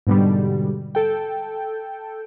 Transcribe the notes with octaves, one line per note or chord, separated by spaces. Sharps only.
G#2 B2 D3 G3
A4 G5